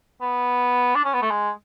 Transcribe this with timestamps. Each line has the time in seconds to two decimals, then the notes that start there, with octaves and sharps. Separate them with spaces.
0.21 B3
0.95 D4
1.05 C#4
1.14 B3
1.22 A3
1.31 G#3